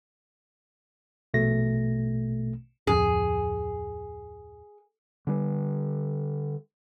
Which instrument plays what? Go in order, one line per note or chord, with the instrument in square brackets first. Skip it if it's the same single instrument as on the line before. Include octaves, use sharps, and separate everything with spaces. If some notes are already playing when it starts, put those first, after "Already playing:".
[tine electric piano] A#1 B2 A3 A#6
[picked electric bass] D1 F2 [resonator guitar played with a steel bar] G#4
[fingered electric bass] D3 G3